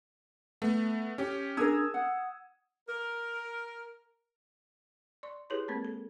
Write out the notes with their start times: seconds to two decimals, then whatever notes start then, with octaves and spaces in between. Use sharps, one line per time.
0.62 A3 B3
1.18 C#4 G4
1.57 D4 G#4 A#4 D#6 E6 G#6
1.94 F#5
2.88 A#4
5.23 D5 C6 C#6
5.50 E4 G4 G#4 B4 C#5 C6
5.68 G#3 A#3 C4 A#4 G#6
5.85 A4